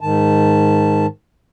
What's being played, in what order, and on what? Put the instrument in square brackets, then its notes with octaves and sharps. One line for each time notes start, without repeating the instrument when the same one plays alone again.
[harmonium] G#2 D#3 A5